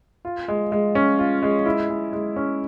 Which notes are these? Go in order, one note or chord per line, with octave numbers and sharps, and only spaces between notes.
F4
G#3
G#3
C#4
F4
G#3
E4
G#3
G#3
C#4